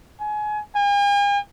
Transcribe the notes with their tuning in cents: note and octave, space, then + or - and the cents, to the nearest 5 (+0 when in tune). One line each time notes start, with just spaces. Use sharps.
G#5 +25
G#5 -45